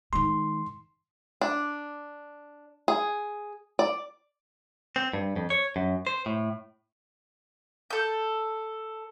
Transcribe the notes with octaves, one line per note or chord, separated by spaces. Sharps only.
D#3 G#3 C6
D4
G#4
D5
C4
G2
F2
C#5
F#2
C5
A2
A4 G6